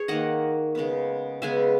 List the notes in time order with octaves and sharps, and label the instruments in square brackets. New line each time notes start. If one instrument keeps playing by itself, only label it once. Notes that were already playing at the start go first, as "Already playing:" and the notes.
Already playing: [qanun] G#4 C#5
D#3 A#3 D#5 F#5
C#3 G#3 B3
C#3 G#3 B3 E5 G#5